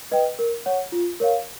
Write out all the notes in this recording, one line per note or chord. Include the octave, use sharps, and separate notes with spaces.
B4 D#5 G5
A#4
C#5 F#5
F4
A#4 C#5 F5